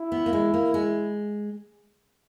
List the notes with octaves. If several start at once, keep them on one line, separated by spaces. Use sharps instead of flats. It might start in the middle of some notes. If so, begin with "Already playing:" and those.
Already playing: E4
B3
A#3
G#3
A#3
G#3